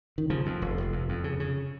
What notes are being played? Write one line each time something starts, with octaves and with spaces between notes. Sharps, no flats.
D#3
C#3 F3
F2
F1
F1
F2
F2
C#3
C#3